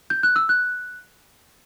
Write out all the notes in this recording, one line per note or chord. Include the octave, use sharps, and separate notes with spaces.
G6
F#6
E6
F#6